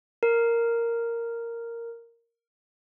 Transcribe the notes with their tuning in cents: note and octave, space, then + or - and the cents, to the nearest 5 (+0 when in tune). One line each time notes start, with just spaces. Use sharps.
A#4 -5